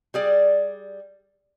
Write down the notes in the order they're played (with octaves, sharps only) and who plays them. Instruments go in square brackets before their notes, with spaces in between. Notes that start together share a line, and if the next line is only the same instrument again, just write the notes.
[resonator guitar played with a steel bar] G3 G#4 D5